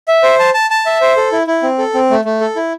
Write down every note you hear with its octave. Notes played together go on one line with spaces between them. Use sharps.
E5
C5
A5
A5
A5
E5
C5
A4
E4
E4
C4
A4
C4
A3
A3
A4
E4